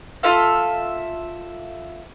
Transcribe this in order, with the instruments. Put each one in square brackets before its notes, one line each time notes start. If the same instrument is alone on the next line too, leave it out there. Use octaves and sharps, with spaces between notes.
[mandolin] F4 A4 E5 F5